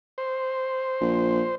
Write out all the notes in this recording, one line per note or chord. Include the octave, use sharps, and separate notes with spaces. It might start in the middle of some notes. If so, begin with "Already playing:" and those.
C5
A#1